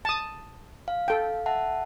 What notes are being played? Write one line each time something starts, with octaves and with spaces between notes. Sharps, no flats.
A5 D#6
F5
A4 G5
E5 F#5 A5